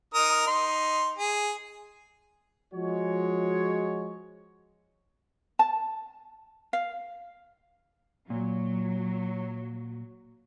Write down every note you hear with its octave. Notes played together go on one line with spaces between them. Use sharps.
D#4 A#4 D#6
D#4 C6
G#4
F3 G#3 F#4 C#5
A5
F5
A#2 F#3